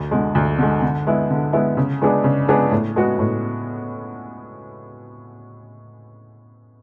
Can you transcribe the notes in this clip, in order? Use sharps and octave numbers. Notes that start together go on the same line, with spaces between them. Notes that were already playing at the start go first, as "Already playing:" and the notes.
Already playing: D2
D3 G#3
D2
D3 G#3
D3
G#3 B3 E4
D3
G#3 B3 E4
C#3
G#3 B3 D4 G#4
C#3
G#3 B3 D4 G#4
A2
G#3 B3 F#4
A2